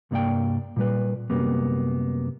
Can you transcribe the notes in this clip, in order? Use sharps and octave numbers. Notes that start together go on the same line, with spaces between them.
C2 G2 A#3 D5 F5 G5
A#2 G3 B4
F#2 C3 G3 A#3 B3